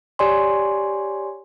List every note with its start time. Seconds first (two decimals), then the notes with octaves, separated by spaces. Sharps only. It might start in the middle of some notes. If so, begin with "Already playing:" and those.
0.19 G4 C#5 D5 G#5 C6